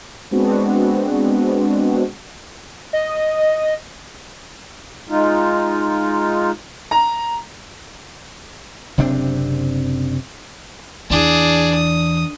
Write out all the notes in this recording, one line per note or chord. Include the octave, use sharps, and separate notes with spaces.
G#3 B3 C4 D4 F#4
D#5
G#3 D#4 F4
A#5
F#1 C3 C4 D4
E2 E3 D4 G#4
D#6